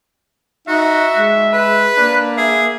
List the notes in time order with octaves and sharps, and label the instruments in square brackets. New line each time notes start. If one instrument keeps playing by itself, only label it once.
[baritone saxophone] D#4 [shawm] F#4 [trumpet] E5
[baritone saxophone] G#3
[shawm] B4
[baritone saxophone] A#3 [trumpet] D4
[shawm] G#4 [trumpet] E5